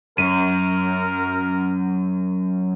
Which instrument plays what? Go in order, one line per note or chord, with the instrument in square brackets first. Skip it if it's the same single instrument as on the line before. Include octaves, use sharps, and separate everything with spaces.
[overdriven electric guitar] F#2 [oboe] A#4 [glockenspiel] D#7